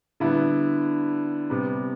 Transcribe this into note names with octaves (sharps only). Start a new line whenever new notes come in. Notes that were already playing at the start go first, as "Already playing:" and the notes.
D3 G3 B3 E4
C3 G3 B3